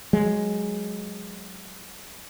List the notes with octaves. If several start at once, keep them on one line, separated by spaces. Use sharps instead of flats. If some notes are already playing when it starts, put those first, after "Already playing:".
F#3 G#3